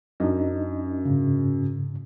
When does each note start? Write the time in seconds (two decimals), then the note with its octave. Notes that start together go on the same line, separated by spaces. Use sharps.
0.20 F#2 D4 D#4 D#5
1.05 G#2 C#3